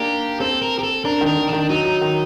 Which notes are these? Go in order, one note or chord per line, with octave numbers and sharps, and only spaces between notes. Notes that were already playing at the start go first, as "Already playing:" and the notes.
Already playing: A#3 D4 D#4 G4
C4 A4
A#4
G4
A4
D4 A#4
D#3
A#4
D#3
D4
D#3
F#3 D#4
F#3
D#3